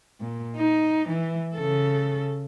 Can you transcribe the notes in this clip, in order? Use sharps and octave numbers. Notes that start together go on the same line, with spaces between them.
A#2
D#4
E3
C#3 A4